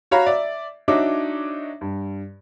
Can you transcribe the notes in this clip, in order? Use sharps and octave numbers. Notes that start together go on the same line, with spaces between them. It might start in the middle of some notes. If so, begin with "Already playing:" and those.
F#4 C#5 F5 A#5 B5
D5 E5
D4 D#4 F#4 C#5 E5 D6
G2